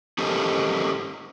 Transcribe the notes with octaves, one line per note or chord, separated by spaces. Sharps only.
C#4 G4 A4 A#4 C5 D#5